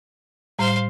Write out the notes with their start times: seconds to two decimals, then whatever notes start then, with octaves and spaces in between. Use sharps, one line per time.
0.59 A2 G3 C5 F5